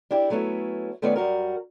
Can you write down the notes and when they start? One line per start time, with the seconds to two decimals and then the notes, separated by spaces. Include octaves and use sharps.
0.11 D4 E4 G4
0.30 F#3 A3 B3 C#4 E4
1.02 D#3 A3 B3 C#4 F4 D5
1.16 F#2 G3 F#4 A#4